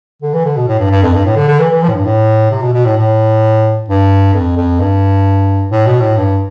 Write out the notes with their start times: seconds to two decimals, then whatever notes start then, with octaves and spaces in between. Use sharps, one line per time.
0.22 D3
0.34 E3
0.45 D3
0.56 B2
0.68 A2
0.79 G2
0.91 G2
1.02 F2
1.14 G2
1.25 A2
1.36 D3
1.48 D3
1.59 E3
1.71 E3
1.82 F3
1.88 A2
1.94 G2
2.05 A2
2.51 C3
2.62 B2
2.73 B2
2.85 A2
2.97 A2
3.88 G2
4.34 F2
4.57 F2
4.80 G2
5.71 A2
5.87 B2
6.01 A2
6.17 G2